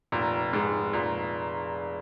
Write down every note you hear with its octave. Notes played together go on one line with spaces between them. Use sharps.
F1 A#2
G#2 G#3
F1 A#2